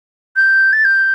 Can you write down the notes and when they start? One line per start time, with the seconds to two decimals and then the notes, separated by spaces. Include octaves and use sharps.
0.36 G6
0.73 A6
0.85 G6